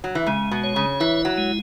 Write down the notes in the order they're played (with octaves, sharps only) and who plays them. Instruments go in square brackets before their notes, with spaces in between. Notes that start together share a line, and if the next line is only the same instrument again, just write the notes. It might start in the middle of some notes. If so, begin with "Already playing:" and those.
[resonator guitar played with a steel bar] F#3
E3
[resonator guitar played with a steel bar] C#3 [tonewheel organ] G#3
[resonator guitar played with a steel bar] B2
[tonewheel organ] C#5
[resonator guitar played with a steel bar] C#3
[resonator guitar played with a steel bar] E3 [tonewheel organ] E4
[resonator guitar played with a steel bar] F#3
[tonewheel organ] G#3